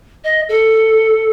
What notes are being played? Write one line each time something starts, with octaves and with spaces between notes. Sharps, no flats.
D#5
A4